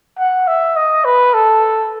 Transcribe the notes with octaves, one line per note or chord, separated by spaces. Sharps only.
F#5
E5
D#5
B4
A4